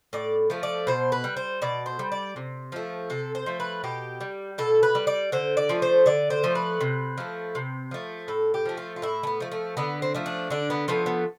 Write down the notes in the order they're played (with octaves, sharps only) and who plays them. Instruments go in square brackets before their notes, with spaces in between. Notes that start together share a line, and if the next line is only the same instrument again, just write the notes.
[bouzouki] A2 D5
F3 A3
D5
B2 C5
B4
G3
C5
B2 D5
C5
G3
D5
C3
F3 A3
C3 A4
C5
F3 A3
B4
B2 G4
G3
B2 A4
B4
G3
D5
D3 C5
D5
F3 A3
C5
D3 D5
C5
F3 A3
B4
C3
F3 A3
C3
F3 A3
A2 A4
G4
F3 A3
F4
F4
A2 E4
A3
B3
F3 A3
A3
D3 B3
C4
F3 A3
D4
D3 D4
B3
F3 A3 B3
B3